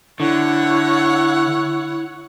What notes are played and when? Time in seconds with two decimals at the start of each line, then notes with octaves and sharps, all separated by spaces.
0.20 D3 E4 C#5 F#5